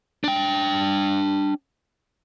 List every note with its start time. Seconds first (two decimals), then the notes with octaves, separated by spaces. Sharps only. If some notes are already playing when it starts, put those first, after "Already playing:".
0.24 D4 G5